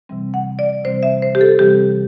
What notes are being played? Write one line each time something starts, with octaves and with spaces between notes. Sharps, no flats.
C3 E3 G3 C4
F#5
D5
C3 E3 G3 C4 C5
E5
C5
G4
A4
C3 E3 G3 C4 G4